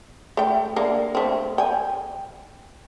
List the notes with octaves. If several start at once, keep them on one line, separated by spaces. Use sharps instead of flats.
A3 G5
D3 A#3
A3 C4
G5 G#5